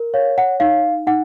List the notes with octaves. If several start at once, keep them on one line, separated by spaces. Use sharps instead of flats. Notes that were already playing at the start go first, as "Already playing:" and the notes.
Already playing: A#4
C#5 F5
F#5
D#4 F5
D#4 F#5